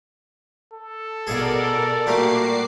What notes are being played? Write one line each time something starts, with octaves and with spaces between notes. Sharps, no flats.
A4
B2 G#4 A#4 D5 E5 F5
A#2 G3 A3 F#4 A#4 D6 C7